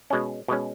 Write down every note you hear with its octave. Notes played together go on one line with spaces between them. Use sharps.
B2 G#3 C#4
B2 G#3 C#4